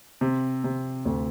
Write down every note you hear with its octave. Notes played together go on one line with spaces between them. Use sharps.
C3
C3
D2